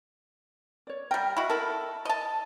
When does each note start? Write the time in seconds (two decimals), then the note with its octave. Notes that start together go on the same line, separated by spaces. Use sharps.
0.87 C#5 D5
1.11 G3 A#4 G5
1.37 E4 F#4 D#5
1.50 E4 A4 A#4
1.70 E5
2.05 D#5 A5